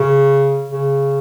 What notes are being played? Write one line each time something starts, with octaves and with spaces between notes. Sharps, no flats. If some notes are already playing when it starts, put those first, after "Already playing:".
Already playing: C#3
C#3